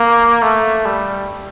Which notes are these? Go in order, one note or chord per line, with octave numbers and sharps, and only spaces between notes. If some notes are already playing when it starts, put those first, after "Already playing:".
Already playing: A#3
A3
G3